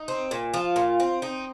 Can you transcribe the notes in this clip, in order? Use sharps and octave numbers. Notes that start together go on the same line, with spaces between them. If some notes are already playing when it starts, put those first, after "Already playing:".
Already playing: D#4
C4
A#2
F3 F4
A#2
C4
D#4